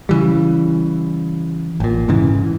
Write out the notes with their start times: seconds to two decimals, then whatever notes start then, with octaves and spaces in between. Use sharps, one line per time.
0.09 C#3 E3 G3
1.80 A1 A#2
2.08 F1 G#2 C#3 E3